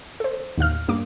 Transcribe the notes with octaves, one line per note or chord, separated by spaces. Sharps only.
A4 C5
D#2 A2 F5 F6
G2 A#3 D6